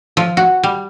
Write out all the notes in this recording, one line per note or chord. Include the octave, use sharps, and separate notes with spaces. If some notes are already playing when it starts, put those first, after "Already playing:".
F3
F#4
G3